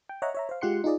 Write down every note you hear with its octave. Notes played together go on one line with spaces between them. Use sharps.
G5
C#5 D#5 E5 F#5 A#5
C#5 E5 A#5
C5 F5
G#3 F4 G4 F#5 C6 C#7
D#4 F4 G#4 D5 D#5